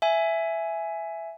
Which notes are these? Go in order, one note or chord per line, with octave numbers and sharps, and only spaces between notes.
E5 G#5